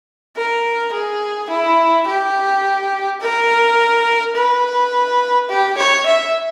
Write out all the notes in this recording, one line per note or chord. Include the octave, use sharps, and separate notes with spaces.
A#4
G#4
E4
G4
A#4
B4
G4
C#5
E5